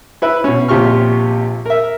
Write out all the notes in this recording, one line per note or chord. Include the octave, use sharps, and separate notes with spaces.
E4 B4 E5
B2 C#4
A#1 C3 F4 G4 C#6 F6
A#4 E5